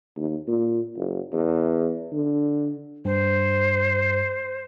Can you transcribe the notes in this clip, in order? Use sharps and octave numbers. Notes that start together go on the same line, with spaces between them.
D#2
A#2
F#1
E2
D3
G2 C5